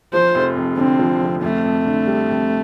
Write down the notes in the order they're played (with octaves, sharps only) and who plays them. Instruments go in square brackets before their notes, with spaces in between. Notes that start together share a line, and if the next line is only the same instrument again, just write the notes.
[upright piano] F3 [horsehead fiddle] C5
[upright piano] F1
F2
[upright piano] D3 [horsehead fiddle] C4
[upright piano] F3
F1
[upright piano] F2 [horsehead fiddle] A3
[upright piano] F2
D3
G3
F2